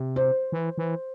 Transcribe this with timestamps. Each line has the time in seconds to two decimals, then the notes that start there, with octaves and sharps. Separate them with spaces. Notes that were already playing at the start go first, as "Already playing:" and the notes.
Already playing: C3
0.16 C5
0.52 E3
0.78 E3